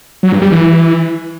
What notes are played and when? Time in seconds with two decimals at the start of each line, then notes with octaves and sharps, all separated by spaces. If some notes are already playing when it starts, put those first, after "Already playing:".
0.23 F#3
0.32 G2
0.42 G3
0.51 E3